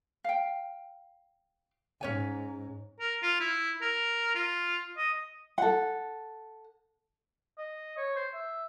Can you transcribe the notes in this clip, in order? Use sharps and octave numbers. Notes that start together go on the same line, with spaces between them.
F5 G5
G#2 C#4 C#5 G#5
A#4
F4
E4
A#4
F4
D#5
A4 F#5
D#5
C#5
C5
E5